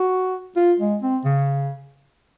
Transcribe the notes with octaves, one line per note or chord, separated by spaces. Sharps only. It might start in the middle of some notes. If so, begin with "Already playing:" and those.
Already playing: F#4
F4
G#3
C4
C#3